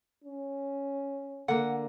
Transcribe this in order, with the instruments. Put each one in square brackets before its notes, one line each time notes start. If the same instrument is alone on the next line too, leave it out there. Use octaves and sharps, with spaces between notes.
[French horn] C#4
[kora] D3 A#3 [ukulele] F#5